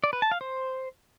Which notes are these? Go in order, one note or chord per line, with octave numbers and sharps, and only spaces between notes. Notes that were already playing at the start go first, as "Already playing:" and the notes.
D5
B4
A5
F5
C5